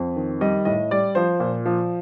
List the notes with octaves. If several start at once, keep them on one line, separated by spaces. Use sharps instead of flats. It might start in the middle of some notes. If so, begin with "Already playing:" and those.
Already playing: F2
D#3
G3 D#5
A2 D#5
G3 D5
F3 C5
A#2
F3